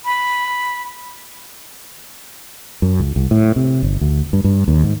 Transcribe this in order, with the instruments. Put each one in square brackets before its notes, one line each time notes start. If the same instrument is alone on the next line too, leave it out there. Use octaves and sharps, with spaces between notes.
[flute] B5
[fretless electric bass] F#2
C#2
C2
A2
C3
G1
D2
G2
G2
D#2
G#2